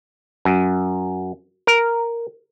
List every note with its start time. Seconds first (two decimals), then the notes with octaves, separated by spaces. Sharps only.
0.45 F#2
1.67 A#4